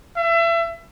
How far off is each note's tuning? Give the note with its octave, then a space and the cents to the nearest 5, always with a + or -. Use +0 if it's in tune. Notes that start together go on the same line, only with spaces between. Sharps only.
E5 +30